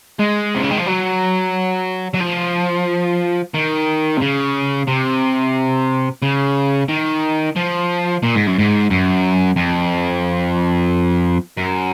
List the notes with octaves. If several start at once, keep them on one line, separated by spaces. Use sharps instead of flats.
G#3
C3
C#3
D#3
F3
F#3
F#3
F3
D#3
C3
C#3
C3
C#3
D#3
F3
A#2
G#2
F#2
G#2
F#2
F2
F#2